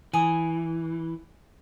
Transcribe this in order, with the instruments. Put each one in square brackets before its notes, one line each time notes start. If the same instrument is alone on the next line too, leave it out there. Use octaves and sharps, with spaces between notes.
[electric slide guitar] E3 [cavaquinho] G#5 D#6